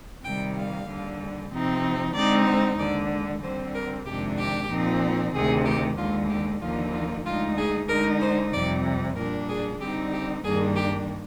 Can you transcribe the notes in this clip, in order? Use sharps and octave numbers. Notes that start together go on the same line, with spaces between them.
C3 D#3 G3 G5
F5
D#2 D3 G3
C3 F3 C4 D#4
D3 G#3 C4 D#4 D5
C5
D#2 D3 G#3 D5
D3 G3 C4 C5
A#4
F2 C3 D#3 G#3 D4 G4
G4
A#2 F3 C4 D#4
D2 C3 D#3 G#4
G4
D#2 D3 G#3 F4
G4
D#2 D3 F3 A#3 D#4 F4
F4
D2 D3 G#3 D#4 F4
G#4
D3 G#3 D#4 A#4
C5
F2 C3 G3 D5
A#2 G3 D4 A#4
G#4
D3 G3 C4 D#4 G4
G4
G2 D#3 G3 A#3 D4 G#4
G4